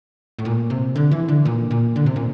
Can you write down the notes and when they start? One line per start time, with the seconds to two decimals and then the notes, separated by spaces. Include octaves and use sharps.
0.39 A2
0.45 A#2
0.70 C3
0.96 D3
1.11 E3
1.28 D3
1.45 A#2
1.71 A#2
1.96 D3
2.06 C3
2.16 A#2